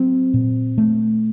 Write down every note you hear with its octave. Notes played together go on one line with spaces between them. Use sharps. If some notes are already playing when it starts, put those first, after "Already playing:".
Already playing: F#3 C4
A#2
A3